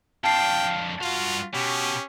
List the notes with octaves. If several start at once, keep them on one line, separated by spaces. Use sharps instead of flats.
F2 D4 F5 G5 A5 C7
G2 F4 F#4 F5
B2 C#4 G4